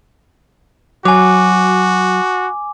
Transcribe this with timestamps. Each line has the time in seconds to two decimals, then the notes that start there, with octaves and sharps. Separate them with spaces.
1.05 F#3 F#4 G#5 D6